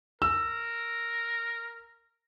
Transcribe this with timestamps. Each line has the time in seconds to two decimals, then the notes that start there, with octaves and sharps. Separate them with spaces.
0.22 A#4 E6